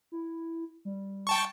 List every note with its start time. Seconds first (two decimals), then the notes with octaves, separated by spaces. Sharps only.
0.12 E4
0.85 G3
1.27 G5 A5 C#6